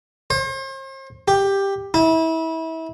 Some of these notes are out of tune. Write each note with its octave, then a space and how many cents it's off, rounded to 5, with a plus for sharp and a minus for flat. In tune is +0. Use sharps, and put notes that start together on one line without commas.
C5 +40
G4 +10
E4 -30